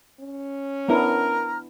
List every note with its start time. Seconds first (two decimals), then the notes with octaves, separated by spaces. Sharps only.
0.20 C#4
0.89 B3 D4 E4 A#4 A#5 F6